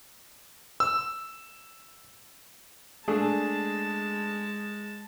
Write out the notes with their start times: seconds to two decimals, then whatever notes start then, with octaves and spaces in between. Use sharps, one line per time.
0.80 E6
3.08 G#3 A3 D4 G#4 A5